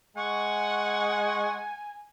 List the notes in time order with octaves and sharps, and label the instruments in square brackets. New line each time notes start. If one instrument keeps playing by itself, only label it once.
[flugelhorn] G#3 [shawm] F#5 [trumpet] G#5 [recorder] C#6